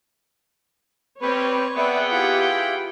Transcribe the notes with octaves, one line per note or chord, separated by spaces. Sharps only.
G3 C4 G4 B4 C#5 C#6
B3 G#4 B4 D5 E5 F#5 G5
E4 F4 G4 B5